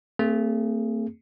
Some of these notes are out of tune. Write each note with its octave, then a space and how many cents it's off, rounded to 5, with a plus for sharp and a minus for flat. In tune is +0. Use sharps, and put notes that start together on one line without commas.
A3 +45 C4 +0 G#4 +0